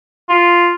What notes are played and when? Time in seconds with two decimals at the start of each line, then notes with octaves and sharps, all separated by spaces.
0.29 F4